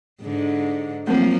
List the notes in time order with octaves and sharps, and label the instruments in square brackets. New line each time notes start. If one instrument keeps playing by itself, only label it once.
[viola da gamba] G#2 D3
[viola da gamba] F3 F#3 A#3 [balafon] A3 C4 A#4